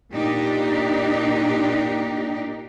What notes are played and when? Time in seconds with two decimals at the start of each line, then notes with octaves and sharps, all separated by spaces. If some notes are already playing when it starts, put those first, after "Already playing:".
0.14 A#2 D4 D#4 G4